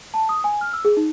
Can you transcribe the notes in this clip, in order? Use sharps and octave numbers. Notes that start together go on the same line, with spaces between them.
A5
D#6
G#5
F6
E6
G#4
D#4